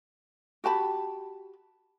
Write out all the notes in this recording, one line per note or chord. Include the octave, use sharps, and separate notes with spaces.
F#4 G4 A5 B5